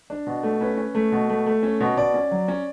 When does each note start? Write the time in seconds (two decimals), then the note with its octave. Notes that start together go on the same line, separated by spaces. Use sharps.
0.10 D4
0.27 B2
0.43 A3
0.61 C#4 B4
0.77 C#4
0.95 A3
1.12 B2
1.29 A3
1.46 A3
1.63 C#4
1.80 B2
1.97 B2 D5
2.14 C#4
2.31 F#3
2.48 C#4